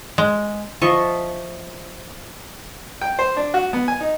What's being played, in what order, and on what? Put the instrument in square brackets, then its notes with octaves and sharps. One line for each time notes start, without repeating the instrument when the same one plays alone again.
[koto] G#3
[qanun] F3 D#5 E5 C#6
[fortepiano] G5
C5
D4
F#4
B3
G#5
D#4